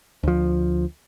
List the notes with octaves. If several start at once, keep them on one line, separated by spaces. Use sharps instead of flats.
D2 F3